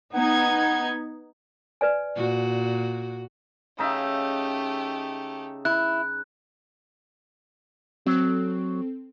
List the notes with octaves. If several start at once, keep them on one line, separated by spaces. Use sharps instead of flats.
B3 D#4 F#5 G#6
B4 D5 G#5
A#2 F#4
C#3 A3 D#4 G4 E5
E4 F#6
F#3 C4 A4